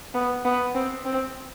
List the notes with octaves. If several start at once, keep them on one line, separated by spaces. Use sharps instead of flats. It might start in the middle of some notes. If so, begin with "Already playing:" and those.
B3
B3
C4
C4